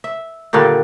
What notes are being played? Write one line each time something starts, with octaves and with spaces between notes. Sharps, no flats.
E5
A#2 D3 D#3 G3